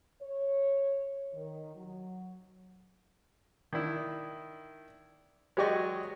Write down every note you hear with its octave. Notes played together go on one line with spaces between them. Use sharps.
C#5
D#3
F#3
D#3 D4 E4
F#3 G#3 G4 D5 D#5 C#6